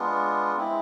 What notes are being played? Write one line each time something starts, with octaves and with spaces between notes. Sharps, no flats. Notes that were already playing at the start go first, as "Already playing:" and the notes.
Already playing: G#3 B3 D4 F4
G#3 C4 E4